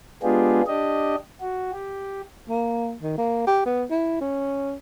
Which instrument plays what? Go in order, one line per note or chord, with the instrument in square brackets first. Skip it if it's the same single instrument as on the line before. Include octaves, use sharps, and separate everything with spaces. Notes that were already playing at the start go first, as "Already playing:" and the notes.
[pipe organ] G#3 B3 D4 F4 G4 G#4
D4 G4 D#5
F#4
G4
[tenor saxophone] A#3
D#3
A#3
G4
B3
E4
C#4